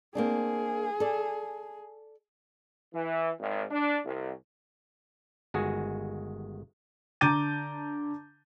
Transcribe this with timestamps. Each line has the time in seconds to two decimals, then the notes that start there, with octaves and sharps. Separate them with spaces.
0.15 A#3 C4 D4 G#4
1.00 A4 D5
2.94 E3
3.39 G#1
3.71 D4
4.04 C2
5.54 G1 D#3 G#3 F#4 G#4
7.21 D3 A#5 D6 G6 A6 D#7